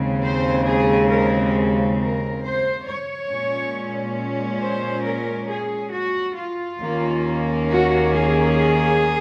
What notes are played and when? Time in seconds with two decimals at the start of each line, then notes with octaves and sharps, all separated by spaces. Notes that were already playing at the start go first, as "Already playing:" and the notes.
Already playing: D#2 C#3 G#3 C4
0.24 C5
0.67 G#4
1.11 A#4
1.99 A#4
2.43 C5
2.87 C#5
3.30 A#2 G#3 C#4
4.62 C5
5.05 A#4
5.49 G#4
5.93 F#4
6.36 F4
6.80 D#2 D#3 A#3 C#4
7.69 F#4
8.12 G#4